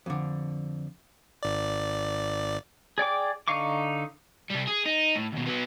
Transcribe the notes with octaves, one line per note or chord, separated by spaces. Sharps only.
F2 D3
G#1 D5
G#4 D5 G5 D6
D3 D#4 F5 C#6 D6
C2 G3
G#4
D#4
A2
D#2 B2
F#3 B3